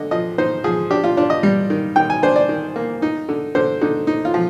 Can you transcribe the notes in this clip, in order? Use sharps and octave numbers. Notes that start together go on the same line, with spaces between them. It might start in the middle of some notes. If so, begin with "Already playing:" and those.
Already playing: D3 D#5
F3 D#5
D#4 C5
F3 G#4
D4 G4
F4
D4 F4
D#5
G3
D#3
D#3 G5
G#5
D4 C5
D5
D#3
A#3
D#4
D3
D3 C5
D3 D#4
D#4
F4
F3